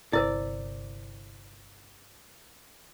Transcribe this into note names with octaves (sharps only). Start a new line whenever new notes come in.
G1 C3 E4 A#4 C5 D5